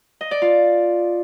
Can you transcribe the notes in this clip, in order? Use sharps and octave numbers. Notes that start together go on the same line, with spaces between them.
D#5
D5
F4